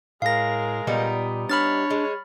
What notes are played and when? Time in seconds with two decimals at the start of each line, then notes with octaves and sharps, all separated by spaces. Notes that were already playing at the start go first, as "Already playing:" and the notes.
0.22 A2 G#3 A#4 F5 A#6
0.87 A#2 G3 B3 D#4
1.49 D4 C#5 B5 F6 A6
1.90 G#3